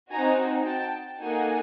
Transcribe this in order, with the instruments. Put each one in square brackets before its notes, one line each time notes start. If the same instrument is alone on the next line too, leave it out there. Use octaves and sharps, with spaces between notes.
[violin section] C4 D#4 F#4 G#5 A#5
G5 A5
A#3 D#4 F#4 A4 F#5 G#5